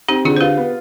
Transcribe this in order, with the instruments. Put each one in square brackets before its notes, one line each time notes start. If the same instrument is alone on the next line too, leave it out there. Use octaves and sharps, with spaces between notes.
[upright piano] C4 [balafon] D#4 G4
[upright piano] D3 [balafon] F4 G#4
[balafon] C5
[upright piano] F4 [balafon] G4 B4
[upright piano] B3